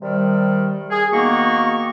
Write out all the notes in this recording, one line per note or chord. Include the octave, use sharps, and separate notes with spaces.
C3 D#3 G3
G#4
D#3 A#3 B3 F#4 C#6